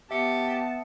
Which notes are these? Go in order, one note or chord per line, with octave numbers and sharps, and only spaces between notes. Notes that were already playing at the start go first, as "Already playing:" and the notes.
B3 G4 E5 A5 C#7